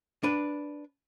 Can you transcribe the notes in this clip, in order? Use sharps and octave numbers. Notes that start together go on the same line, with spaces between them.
D4 B4